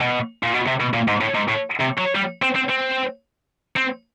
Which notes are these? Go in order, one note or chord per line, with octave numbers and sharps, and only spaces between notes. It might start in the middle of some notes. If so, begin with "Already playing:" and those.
B2
A#2
B2
C3
B2
A#2
G#2
A2
G#2
A2
C3
F#3
G3
C4
C4
C4
C4